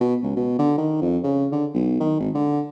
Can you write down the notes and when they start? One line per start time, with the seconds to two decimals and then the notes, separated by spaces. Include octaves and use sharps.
0.01 B2
0.23 C#2
0.37 B2
0.59 D3
0.78 D#3
1.02 F2
1.24 C#3
1.52 D3
1.74 B1
2.00 D#3
2.20 G#1
2.35 D3